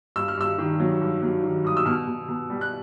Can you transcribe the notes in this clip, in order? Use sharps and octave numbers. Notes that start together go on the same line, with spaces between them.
G2 E6
F6
G2 E6
D#3
F#3
G2
F#3
D#3
G2 D#6
E6
B2 F6
B2
B2
G3
F#6